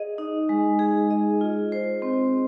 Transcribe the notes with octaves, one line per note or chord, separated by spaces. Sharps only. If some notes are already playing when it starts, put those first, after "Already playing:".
Already playing: G#4 D#5
D#4
G#3
G#4
D#5
F4
C5
C4